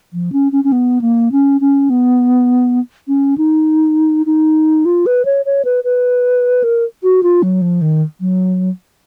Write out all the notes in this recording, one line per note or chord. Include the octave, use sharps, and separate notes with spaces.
F3
C#4
C#4
C#4
B3
A#3
C#4
C#4
B3
C#4
D#4
D#4
F4
B4
C#5
C#5
B4
B4
A#4
F#4
F4
F#3
F3
D#3
F#3